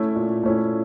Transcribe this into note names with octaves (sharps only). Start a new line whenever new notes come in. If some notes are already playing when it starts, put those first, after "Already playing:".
Already playing: A3 C#4 E4
A#2
A3 C#4 E4